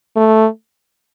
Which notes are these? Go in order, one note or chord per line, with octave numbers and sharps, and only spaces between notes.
A3